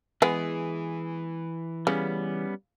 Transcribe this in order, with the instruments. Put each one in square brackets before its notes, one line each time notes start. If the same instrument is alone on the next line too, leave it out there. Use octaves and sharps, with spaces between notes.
[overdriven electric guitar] E3 [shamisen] G#3 B3 [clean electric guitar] G#4
[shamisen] C#3 [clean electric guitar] G3 B3 C#4